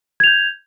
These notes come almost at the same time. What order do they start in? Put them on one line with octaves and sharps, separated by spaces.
G#6 F7 G6